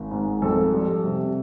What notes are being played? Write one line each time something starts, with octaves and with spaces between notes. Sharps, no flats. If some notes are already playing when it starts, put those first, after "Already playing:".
Already playing: G#1
G#2
F2 A4
G3
C3